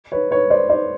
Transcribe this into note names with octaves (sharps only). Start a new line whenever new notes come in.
B4 C#5
B4 C#5
C5 D5
C5 D5